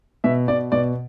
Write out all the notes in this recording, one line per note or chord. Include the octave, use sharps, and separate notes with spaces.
B2 E5
B2 D5
B2 D5